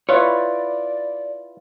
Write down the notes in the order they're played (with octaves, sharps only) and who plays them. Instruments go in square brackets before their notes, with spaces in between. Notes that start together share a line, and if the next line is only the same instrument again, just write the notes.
[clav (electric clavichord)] E4 F4 B4 [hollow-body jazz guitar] C#5 [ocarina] D5